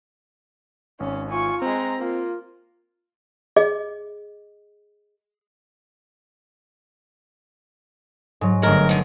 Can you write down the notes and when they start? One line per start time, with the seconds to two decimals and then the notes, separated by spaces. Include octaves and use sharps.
1.00 G#1 C#4
1.31 F4 G#5 C#6
1.62 G#3 C4 A#5
2.00 A#3 F4
3.56 G#4 D#5
8.41 G#2 F#3
8.62 G1 G#3 A3 A#4 A#6
8.89 D3 D#3